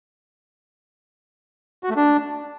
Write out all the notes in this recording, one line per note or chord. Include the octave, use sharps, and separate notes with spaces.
F#4
A3
D4